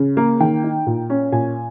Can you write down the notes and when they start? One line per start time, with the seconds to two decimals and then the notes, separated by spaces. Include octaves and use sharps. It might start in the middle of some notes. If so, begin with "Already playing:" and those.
Already playing: C#3
0.17 A#3
0.40 D#3 G5
0.64 D#4
0.87 A#2
1.10 C#4
1.32 A#2 G#5